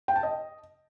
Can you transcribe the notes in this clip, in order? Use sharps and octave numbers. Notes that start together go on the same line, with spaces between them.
G5
A5
D#5